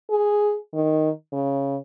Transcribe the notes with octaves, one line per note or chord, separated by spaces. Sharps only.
G#4
D#3
C#3